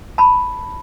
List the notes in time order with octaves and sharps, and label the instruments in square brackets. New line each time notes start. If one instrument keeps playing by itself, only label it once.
[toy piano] A5 B5